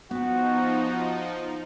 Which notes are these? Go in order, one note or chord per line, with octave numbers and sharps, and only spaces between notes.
F3 B3 D#4 F#4 G5